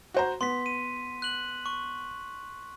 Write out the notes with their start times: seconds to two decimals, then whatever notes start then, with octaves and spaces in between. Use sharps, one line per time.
0.14 F#4 C5 A#5
0.41 B3 C6 B6
0.66 D#7
1.22 F#6 F#7
1.66 C#6